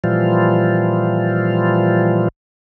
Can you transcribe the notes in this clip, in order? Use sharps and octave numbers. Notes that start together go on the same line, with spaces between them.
A#2 E3 F3 G3 F4